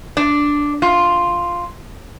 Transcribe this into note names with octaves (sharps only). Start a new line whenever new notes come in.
D4
F4